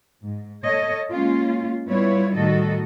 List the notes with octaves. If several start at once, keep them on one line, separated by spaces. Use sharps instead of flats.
G#2
A4 C#5 D#5
G#3 A#3 C#4 F4
G3 B3 E4 F4 B4 C#5
A2 D#3 G3 F#4 A4 D#5